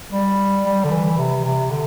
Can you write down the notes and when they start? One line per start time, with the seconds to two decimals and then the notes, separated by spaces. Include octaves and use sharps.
0.13 G3
0.65 G3
0.84 D3
0.91 E3
1.18 C3
1.45 C3
1.71 D3